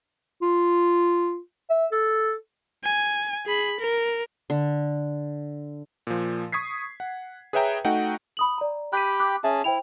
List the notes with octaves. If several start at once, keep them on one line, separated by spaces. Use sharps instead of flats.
F4
E5
A4
G#5
G#4 B5
A#4
D3
A#2 F3
C#6 D#6 G#6 B6 C7
F#5
G#4 B4 C#5 E5 G5 A#5
A3 D#4 F#4 F#5 G5
B5 D#6 F#7
D5 A#5
G4 G5 B5 F#6 B6 D#7
D6 F#6
C#4 G#4 E5 A5
E4 C5 G5 F7